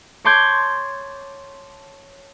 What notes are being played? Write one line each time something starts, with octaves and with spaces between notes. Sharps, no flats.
C#5 A5 C6 D6 G6 G#6